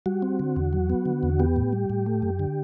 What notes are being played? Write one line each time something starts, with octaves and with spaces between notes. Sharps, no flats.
G3 F#4
C4
D3
E2
F#3
B3
D3
E2
B3 G4
A2
G3
A2
A3
F#2
D3